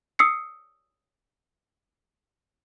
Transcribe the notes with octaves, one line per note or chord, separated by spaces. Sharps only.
D#6 E6 C7 C#7